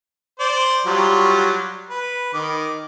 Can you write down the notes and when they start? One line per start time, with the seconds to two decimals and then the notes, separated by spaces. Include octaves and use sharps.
0.40 C5 D5
0.86 F#3 G3 F4
1.90 B4
2.34 D#3 D6